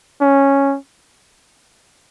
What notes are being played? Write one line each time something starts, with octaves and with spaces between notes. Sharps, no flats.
C#4